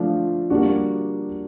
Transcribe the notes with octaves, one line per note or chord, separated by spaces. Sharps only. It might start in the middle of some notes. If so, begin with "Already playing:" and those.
Already playing: F3 A3 D4 F4
G3 A#3 D4 F#4